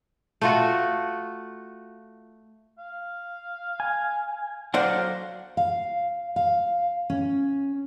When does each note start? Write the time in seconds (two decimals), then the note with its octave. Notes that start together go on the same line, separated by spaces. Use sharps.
0.41 A3 F4 F#4
2.78 F5
3.80 G#5
4.74 F#3 A4 C5 D5 F5 F#5
5.57 F5
6.36 F5
7.10 C#4